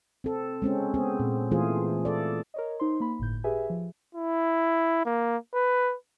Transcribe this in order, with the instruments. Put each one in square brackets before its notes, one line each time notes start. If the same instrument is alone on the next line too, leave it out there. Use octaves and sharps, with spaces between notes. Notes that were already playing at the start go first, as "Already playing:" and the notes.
[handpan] C4 A4
G#3 C4 C#4
B3 C4 G#4
A#2
E3 A3 F4 G#4 C5
A4 D5
[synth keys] A#4 C#5 D#5
D#4 C5 C6
A#3 B5
G1 A2 G6
G4 G#4 B4 E5 G#5
F3
[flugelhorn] E4
A#3
B4